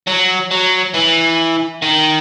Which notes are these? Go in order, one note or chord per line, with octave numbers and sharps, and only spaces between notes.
F#3
F#3
E3
D#3